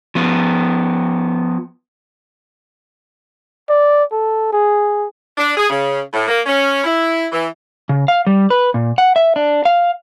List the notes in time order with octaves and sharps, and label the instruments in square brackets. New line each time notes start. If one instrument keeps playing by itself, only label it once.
[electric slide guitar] F3 B3
[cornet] D5
A4
G#4
[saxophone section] D4
G#4
C#3
A2
A#3
C#4
E4
E3
[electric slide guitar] C#3
F5
G3
B4
A#2
F#5
E5
D4
F5